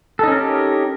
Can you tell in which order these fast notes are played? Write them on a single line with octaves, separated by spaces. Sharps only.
A4 D#4 C#4 A#4 G4